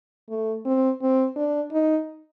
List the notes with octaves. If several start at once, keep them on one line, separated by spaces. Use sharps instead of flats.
A3
C4
C4
D4
D#4